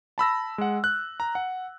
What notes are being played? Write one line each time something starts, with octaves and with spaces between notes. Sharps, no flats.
A5 B5 E6 A#6
G#3 F#5
F#6
A#5
F#5